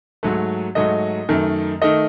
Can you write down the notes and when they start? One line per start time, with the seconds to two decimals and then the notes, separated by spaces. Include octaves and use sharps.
0.23 G#2 F#3 A3
0.75 G#2 F#3 A3 D#5
1.29 F#2 D#3 A3
1.82 D#3 A3 D#5